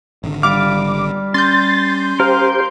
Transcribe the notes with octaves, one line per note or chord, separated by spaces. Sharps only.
G#1 D3
G3 F5 D6
C#4 C6 G6 A6
G4 A#4 C5 F5